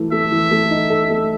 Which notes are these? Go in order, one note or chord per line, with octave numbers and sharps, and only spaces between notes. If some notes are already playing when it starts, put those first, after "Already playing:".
Already playing: E3 A3 A4
A3 E5
E3
A3
D#4
A4
A3